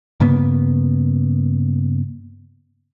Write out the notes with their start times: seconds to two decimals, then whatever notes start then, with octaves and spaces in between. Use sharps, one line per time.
0.20 G2 C#3 A#3 B3